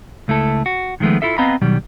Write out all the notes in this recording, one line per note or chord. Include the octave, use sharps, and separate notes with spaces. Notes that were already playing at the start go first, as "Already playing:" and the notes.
C#2 A3 E4 A4
F#4
D#3 F3 G#3 A3 B3
E4 F4 A4 E5
B3 C4 D#5 F5 A#5 B5
B2 D#3 F#3 G3